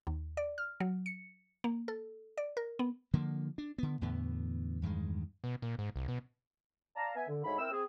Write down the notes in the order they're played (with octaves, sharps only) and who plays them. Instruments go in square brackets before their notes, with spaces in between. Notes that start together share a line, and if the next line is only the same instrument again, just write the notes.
[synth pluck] D#2
D5
F6
F#3
C#7
A#3
A4
D5
A#4
B3
[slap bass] D3 F3 A#3
D4
D3 B3
E2 A2 D3 B3
E2 G2 D#3 G#3
[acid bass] B2
A#2
G#2
C2
B2
[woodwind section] D5 F5 A5 A#5
B3 E5 G#5
D3
D2 G#2 C#5 E5 B5
C4 E4 A#4 G5 E6
C4 G#4